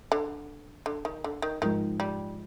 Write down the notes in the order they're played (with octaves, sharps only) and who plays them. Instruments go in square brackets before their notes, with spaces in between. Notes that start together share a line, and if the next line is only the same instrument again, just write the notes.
[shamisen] D3
D3
D#3
D3
D#3
[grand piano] G#2 F3 G#3 [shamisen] D#3
[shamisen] G3